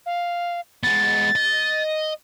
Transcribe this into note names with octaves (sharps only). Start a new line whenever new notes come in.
F5
G#3 B3 A6
D#5